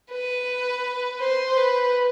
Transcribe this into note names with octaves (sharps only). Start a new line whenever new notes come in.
B4
C5
B4